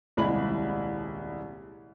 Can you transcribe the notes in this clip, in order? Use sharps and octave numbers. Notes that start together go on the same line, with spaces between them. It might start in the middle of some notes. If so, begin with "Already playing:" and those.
D#1 C2 G#3 E4 B5 F#7